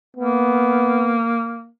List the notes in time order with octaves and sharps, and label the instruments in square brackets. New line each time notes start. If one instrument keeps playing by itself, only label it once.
[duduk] A#3 [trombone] B3